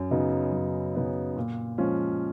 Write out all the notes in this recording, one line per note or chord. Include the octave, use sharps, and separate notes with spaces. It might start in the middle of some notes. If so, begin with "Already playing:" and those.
Already playing: F#2
C#3 F#3 B3 D#4
F#2
C#3 F#3 B3 D#4
A#2
F3 G#3 C#4 F4